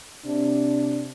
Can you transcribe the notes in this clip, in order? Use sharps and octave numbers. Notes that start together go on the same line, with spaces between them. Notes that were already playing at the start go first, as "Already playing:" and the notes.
C3 D4